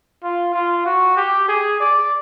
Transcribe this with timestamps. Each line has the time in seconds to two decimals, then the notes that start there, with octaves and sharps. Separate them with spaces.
0.23 F4
0.54 F4
0.86 F#4
1.17 G4
1.48 G#4
1.80 D5